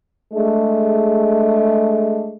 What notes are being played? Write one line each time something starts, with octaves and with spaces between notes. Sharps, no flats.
G#3 A3 D4 G#4